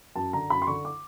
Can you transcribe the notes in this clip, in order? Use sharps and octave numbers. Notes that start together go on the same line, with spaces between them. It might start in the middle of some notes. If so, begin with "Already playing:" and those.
F#2 A5
D3 A#5
F#2 B5
C6
D3 C#6
D6